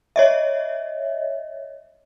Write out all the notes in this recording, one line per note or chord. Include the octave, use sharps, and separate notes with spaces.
C#5 D#5 E5